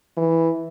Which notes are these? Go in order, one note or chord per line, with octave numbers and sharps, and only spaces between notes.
E3